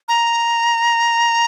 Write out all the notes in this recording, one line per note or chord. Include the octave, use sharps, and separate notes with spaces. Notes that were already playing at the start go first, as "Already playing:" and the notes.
A#5